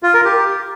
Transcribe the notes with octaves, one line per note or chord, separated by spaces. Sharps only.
F4
A#4
G4